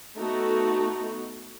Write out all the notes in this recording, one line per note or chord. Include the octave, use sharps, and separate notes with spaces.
A3 B3 D#4 F#4 A4